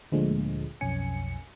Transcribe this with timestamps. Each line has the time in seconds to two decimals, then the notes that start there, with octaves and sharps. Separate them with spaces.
0.12 D2 A#2 D3 F3 G#3
0.81 B1 F2 C#4 G#5 C#7